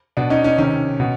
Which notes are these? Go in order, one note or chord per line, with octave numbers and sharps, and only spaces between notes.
B2 D4
C#4 D#4
C#4 D#4
C3 D#3 C#4
B2